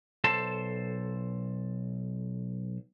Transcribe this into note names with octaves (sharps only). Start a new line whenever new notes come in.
B1 A4 C5 A5